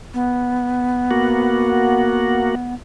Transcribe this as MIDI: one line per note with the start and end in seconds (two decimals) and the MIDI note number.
0.14 2.74 59
1.11 2.55 58
1.11 2.55 66